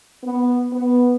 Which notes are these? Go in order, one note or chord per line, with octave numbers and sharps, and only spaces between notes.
B3
B3